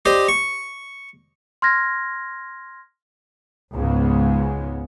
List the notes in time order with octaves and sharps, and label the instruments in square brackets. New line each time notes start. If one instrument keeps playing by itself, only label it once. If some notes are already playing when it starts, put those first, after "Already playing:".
[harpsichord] G4 C5 D5 D#5
C#6
[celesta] C6 F6 G#6 A#6
[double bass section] C#2 G#2 C#3 G#3 B3